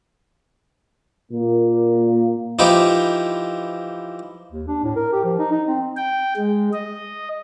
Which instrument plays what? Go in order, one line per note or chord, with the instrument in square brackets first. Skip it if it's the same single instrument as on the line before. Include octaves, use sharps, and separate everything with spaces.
[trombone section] A#2 A#3
[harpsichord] E3 F3 D#4 G4
[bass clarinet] D#2
D4
A2
A#4
G4
F3
D#4
D#4
C4
[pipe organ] G5
G#3
D#5